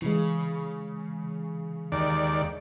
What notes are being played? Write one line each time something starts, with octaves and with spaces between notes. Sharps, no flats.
C#3 E3 G#3
D#2 D5